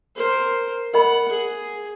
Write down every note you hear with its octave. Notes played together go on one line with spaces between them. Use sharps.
A#4 C5
A#4 D#5 F#5 B5
G#4